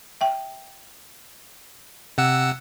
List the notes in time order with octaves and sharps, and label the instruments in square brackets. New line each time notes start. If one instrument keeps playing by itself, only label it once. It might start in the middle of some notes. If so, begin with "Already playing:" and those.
[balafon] E5 G5
[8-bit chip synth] C3 F#5 E6